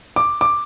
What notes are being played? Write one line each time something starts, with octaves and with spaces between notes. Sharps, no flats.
D6
D6